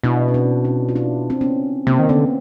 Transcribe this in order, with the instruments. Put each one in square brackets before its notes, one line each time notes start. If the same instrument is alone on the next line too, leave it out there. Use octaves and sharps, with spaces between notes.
[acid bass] B2 [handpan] D4 E4
[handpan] C#4
C4 D4
C#4 D#4
F4
D4 E4
C4
B3 C#4
[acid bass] C3 [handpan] A#3 C4
[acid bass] D#3
[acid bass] D3 [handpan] B3 C#4